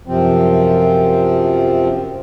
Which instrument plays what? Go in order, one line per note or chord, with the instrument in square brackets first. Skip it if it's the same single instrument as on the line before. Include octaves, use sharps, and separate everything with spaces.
[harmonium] F#2 C3 F3 C4